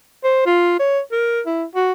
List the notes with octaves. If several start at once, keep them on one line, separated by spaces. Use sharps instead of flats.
C5
F4
C#5
A#4
E4
F#4